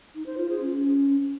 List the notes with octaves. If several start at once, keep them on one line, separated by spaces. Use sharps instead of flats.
D#4
C5
F4
G#4
C#4